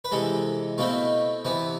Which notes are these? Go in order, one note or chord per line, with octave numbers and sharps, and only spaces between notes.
B4
C3 E3 G#3 A4
B2 A3 C4 E4 F4
C3 E3 B3 E4